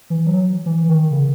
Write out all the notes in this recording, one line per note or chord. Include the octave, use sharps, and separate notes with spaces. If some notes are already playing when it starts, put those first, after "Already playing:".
E3
F#3
E3
D#3
C#3